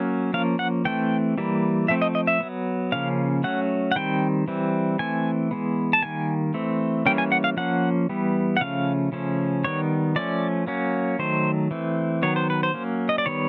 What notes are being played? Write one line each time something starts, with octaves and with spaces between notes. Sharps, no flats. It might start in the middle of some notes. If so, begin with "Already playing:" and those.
Already playing: F#3 A#3 C#4
F3 A#3 C#4 F5
F#5
E3 A3 C4 G5
E3 G3 A#3
F3 A3 C4 E5
D#5
D#5
E5
F#3 B3
C#3 F3 A#3 C#4 F5
F#3 A3 C#4 F#5
F#5
D#3 G3 C4 G5
E3 G3 C4
E3 A3 C4 G#5
E3 G#3 B3
A5
D#3 G3 A#3 G#5
E3 A3 C4
E3 G3 A#3 C#4 G5
G#5
F#5
F5
F3 A#3 C#4 F#5
E3 G3 B3
F#5
C#3 F3 A3 C#4 F5
C#3 F3 A3 C#4
D#3 G3 B3 C#5
F3 A3 C#4 D5
F#3 A#3 C#4
D#3 F#3 A3 C5
E3 A3 C4
D#3 F#3 B3 C#5
C5
B4
C5
F#3 A#3 C#4
D#5
D5
D#3 G3 B3 C#5